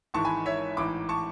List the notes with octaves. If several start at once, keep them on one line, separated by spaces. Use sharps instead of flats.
G#1 G#2 E3 A5 C#6
G#5 B5
C#5 E5
A1 G#2 E3 B5 D6
A5 C#6